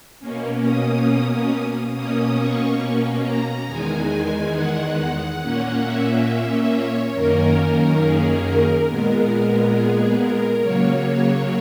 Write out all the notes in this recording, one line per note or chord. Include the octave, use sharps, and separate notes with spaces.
B2 A#3 C#4
D#6
D#6
B2 A#3 C#4 D#6
C#6
A#5
E2 D#3 G#3 G#5
F#5
A#2 A#3 C#4
E5
C#5
F#2 D#3 A#3 C#4 A#4
A#4
G#4
A#4
A#2 G#3 B3
G#4
A#4
C#3 F#3 A#3 C#5